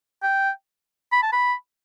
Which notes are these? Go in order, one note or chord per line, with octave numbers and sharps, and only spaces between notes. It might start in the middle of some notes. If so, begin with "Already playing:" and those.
G5
B5
A5
B5